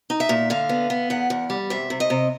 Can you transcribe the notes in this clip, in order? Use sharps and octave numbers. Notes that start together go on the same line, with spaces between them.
D#4
E5
A#2
D3 F5
B3
B3
E2 F#5
E2
G3
C3 E5
C3
D#5
C3